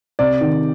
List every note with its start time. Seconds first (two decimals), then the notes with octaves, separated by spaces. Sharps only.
0.19 C3 D5
0.41 D#3